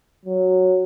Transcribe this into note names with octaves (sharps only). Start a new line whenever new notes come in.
F#3